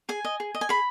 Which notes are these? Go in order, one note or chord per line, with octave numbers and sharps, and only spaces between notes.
G#4 G#5
D#5
G#4
D#5
G#5
G#4 B5